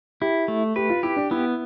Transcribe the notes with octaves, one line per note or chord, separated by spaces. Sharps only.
E4 G4
A3
G4 B4
F4
E4 G4
D4
B3 E4